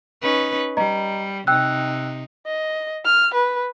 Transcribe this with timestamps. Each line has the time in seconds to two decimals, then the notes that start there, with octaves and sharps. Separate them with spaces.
0.21 C#4 D#4 B4
0.77 G3 D#5 A#5
1.47 C3 D#4 G5 E6 F#6
2.46 D#5
3.05 F6
3.34 B4